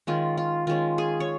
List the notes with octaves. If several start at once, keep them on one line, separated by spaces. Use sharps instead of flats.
D#3 G#3 C#4 F4
F4
D#3 G#3 C#4 F4
G#4
C#5